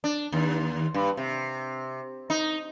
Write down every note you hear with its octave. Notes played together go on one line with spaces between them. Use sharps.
D4
D#2
G2
C3
D#4